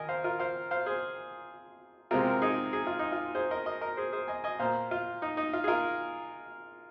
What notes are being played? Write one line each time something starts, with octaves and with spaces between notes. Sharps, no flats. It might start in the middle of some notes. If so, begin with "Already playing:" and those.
Already playing: D#3 A#4 D#5 G#5
C5 F5
F4 A#4
C5 F5
C5 F5
G#4 C5
C3 G#3 C4 F4 A#4
A#4
D#4 G#4
G#4
F4
D#4
F4
G#4 C5
A#4 D#5
A#4 D#5
A#4 D#5
G#4 C5
G#4 C5
D#5 G#5
D#5 G#5
A#2 A#3 C5 F5
F4
D#4
D#4
F4
G#4
F4 A#4